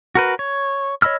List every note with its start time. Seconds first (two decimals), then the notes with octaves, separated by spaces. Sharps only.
0.15 F#4 A#4 B4
0.39 C#5
1.02 C#5 D#5 B5 E6 F6